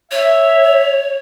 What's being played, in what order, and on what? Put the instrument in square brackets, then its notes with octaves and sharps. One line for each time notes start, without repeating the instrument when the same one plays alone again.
[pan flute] C#5 [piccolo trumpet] E5